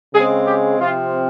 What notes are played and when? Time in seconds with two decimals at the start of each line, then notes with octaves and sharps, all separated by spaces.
0.13 C#3 G#3 C4 G#4
0.46 G4
0.79 C3 F3 C4 F4